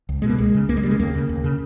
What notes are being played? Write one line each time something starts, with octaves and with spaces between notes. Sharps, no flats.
C#2
B2 G#3
A#3
C#2 G#3
C#3
C#2 A#3
G#3
C#3 G3
G#3
D#2 A#3
C#3
D#2
C#3